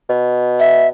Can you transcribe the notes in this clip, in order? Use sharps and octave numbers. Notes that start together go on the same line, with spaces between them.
B2
E5